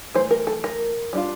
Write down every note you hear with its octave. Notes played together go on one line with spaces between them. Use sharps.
E3 A3 C5
A#4
A4
A#4
G3 D4 F4